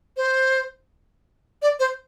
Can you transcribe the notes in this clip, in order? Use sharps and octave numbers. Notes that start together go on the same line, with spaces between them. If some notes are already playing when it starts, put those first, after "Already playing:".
C5
D5
C5